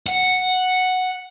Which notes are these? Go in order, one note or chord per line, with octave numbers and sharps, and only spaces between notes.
F#5